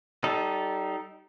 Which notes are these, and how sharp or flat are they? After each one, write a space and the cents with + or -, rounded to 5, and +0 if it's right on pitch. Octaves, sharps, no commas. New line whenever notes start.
G3 -25 D#4 +0 A4 -5